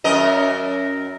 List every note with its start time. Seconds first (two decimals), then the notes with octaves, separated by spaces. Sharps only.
0.04 F#2 A#4 D#5